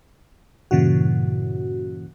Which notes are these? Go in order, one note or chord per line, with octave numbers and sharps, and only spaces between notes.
G2 A#2 C#3 E3 F#4